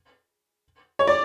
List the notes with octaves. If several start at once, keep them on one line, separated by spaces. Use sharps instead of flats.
C#5
D5